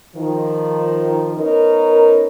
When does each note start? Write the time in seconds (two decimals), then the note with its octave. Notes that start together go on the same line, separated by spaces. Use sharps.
0.16 D#3 F3
1.37 B3 C#4 D#4 A#4